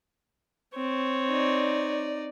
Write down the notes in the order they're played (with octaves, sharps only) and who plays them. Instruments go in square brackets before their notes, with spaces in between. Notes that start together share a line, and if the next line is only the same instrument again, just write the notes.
[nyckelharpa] C4 C#5
[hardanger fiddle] D#4 D5